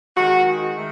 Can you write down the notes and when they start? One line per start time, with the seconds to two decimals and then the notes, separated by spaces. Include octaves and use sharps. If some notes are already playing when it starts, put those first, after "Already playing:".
0.16 D#3 G#3 F#4
0.75 D#3 A3